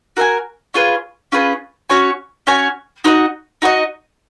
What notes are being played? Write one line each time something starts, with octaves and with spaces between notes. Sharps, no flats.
F#4 A#4 F5 G#5
C#4 F4 G#4 B4
C#4 F4 G#4 B4
C#4 F#4 C#5 G#5
C#4 F#4 C#5 G#5
D#4 F#4 B4 D#5
D#4 F#4 B4 D#5